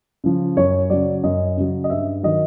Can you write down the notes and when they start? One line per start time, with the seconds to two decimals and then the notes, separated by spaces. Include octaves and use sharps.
0.24 C#3 F3
0.57 F#2 C#5
0.90 C#3 F#3 D5
1.23 F#2 D#5
1.57 C#3 F#3
1.84 D#5
1.90 G2 E5
2.23 D#3 F#3 D#5